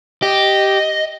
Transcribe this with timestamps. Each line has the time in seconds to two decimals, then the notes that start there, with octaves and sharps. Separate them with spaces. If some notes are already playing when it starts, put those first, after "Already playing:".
0.22 G4 D#5